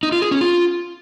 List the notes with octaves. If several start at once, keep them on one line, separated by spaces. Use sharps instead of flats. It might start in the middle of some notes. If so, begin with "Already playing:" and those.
D#4
F4
G#4
C#4
F4